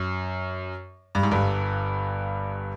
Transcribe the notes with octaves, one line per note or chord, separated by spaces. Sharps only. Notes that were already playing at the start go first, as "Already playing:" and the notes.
Already playing: F#2
G2
G#2
G1 G2